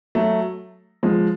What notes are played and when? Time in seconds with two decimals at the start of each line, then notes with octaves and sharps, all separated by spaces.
0.15 F#3 A3
1.03 F3 G#3